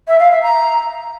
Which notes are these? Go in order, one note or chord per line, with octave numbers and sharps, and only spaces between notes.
E5
F5
E5
A#5